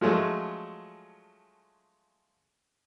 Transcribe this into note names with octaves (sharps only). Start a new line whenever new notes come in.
F3 F#3 G#3 A3 C#4